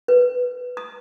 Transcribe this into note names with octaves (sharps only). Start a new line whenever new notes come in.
B4
D#6